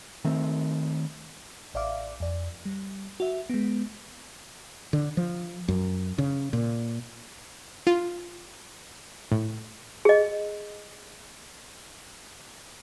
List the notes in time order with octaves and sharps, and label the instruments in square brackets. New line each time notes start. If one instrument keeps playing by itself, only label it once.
[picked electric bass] D#3 A3 C4
[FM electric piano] A1 D5 E5 F5 D6
F2 D5
G3
F#4 E5
G#3 B3
[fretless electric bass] D3
F3
F#2
C#3
A#2
[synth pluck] F4
A2
[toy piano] G#4 D#5